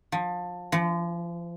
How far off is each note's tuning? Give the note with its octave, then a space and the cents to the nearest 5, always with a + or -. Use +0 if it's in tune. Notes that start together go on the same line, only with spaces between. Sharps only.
F3 +25
F3 -35